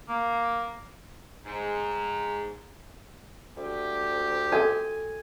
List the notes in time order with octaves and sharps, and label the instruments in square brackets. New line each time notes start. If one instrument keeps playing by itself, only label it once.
[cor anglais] A#3
[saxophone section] G#2
[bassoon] D2 [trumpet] G4
[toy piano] F#4 A4 [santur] G#5